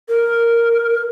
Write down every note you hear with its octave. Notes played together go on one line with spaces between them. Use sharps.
A#4